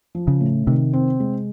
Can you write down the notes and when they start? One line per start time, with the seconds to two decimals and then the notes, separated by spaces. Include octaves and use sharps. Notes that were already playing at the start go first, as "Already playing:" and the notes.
0.15 F3
0.27 C#3
0.41 A2
0.67 C3 D#3
0.93 C4
1.20 G#3